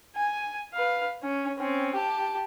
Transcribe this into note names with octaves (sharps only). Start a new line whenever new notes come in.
G#5
B4 F5
C#4
C4 C#4
G4 A5